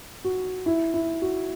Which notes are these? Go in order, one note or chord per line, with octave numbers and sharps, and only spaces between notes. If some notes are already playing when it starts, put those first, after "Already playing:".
F#4
E4
E4
F#4